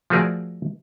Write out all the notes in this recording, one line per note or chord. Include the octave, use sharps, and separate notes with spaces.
F3 A3 F#4 G#4 A#4 D5